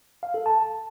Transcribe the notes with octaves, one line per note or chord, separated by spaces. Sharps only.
F5
A4
A5